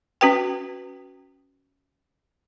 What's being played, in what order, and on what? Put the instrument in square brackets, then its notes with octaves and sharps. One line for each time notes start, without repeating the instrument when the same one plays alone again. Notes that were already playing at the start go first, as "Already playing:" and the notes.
[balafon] C#4 F#4 B4 G5